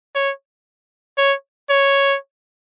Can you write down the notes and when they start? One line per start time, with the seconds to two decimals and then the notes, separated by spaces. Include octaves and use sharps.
0.15 C#5
1.18 C#5
1.70 C#5